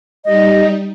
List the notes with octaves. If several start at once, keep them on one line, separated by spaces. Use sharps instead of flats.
G3 D#4 D#5